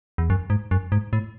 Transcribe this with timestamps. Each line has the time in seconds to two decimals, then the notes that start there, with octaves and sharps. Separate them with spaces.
0.18 E2
0.30 F#2
0.50 G#2
0.71 F#2
0.92 G#2
1.13 A2